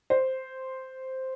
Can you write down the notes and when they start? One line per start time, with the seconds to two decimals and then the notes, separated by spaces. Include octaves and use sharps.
0.10 C5